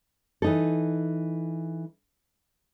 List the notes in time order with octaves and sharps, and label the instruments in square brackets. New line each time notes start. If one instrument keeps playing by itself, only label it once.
[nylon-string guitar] E3 D#4 A4